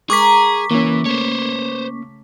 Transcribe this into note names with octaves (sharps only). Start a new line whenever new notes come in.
G#3 G#4 A#4 A#5 C#6 D6 B6
C#3 E3 A#3 C#4
A3 C5 C#5